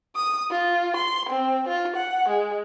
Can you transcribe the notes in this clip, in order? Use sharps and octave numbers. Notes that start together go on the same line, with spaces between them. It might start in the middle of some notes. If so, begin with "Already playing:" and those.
D#6
F4
C6
C4
F4
F#5
G#3